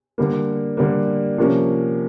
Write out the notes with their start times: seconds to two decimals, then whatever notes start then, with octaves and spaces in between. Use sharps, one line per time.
0.18 D3 G3 A#3
0.77 D3 G3 A#3
1.38 C3 F3 A#3 C#4